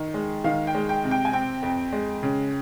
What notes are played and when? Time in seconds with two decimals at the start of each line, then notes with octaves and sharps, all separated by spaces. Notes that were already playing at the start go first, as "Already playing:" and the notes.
Already playing: D#3
0.14 G#3
0.44 D#3 F5
0.67 G5
0.75 G#3
0.89 G5
1.04 C3
1.11 G5
1.25 G#5
1.33 C4 G5
1.63 F2
1.93 G#3
2.23 C#3